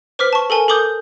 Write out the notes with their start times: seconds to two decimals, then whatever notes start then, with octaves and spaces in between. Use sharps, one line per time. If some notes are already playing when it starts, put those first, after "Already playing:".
0.19 B4 C5 D6 F6 B6
0.33 A5 C#6
0.50 A4 A#4 G#5 A5
0.68 A4 A#4 D6 D#6 G6